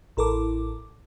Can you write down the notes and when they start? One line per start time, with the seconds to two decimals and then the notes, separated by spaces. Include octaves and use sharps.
0.17 A1 E4 A4 A#4 D6